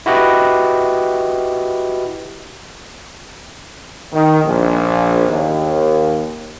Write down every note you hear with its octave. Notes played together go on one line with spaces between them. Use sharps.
E4 F#4 G4 B4 D#5
D#3
A#1
D#2